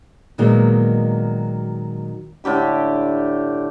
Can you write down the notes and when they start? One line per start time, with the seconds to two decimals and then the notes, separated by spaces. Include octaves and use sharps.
0.38 A#2 D#3 F#3 G#3 A#3 B3
2.44 A2 D3 G4 B5